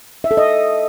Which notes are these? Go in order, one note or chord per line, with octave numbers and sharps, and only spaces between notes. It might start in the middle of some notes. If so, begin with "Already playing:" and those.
E5
A4
D#5